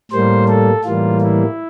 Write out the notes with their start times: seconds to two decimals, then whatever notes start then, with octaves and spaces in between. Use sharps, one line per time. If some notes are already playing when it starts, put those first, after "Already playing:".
0.11 A2 G3 A#3 C5
0.48 A4
0.84 A2 E3 G3 A#3 F4
1.21 E4